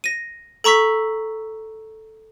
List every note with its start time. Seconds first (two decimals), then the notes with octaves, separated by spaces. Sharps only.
0.04 A#6 D#7
0.64 A4 A#5 C#6 E6 B6